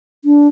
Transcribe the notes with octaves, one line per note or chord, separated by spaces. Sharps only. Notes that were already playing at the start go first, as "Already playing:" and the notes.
D4